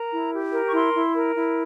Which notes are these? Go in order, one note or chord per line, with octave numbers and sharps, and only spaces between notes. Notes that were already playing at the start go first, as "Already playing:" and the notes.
Already playing: A#4 A#5
E4
G4
A#4
C#6
E4 C6
E4
A#4
E4